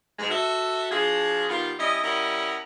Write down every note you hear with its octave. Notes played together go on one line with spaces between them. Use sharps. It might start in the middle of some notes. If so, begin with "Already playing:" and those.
G#2 B2 G#3
F#4 A4 E5
F3 D4 F4 F#4 G#4
D#3 G3 B3 F4
G3 C#4 E4 D#5
G3 C#4 E4 A#4 D#5 F#5